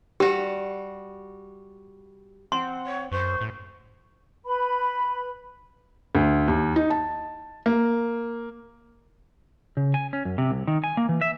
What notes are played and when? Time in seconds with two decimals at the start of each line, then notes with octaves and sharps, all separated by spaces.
0.20 G3 F#4 G4
2.52 C4 F#5 C6
2.86 C#5
3.12 F#2 C5 C#6
3.41 A2
4.44 B4 B5
6.15 D2
6.48 D#2
6.76 D#4
6.90 A5
7.66 A#3
9.77 C#3
9.94 G#5
10.13 C#4
10.25 F#2
10.38 C3
10.51 C2
10.67 D#3
10.84 G#5
10.97 A#3
11.09 E3
11.21 E5